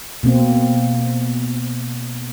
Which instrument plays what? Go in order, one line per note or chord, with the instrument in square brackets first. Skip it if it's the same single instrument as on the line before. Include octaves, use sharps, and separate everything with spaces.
[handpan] B2 A#3 C4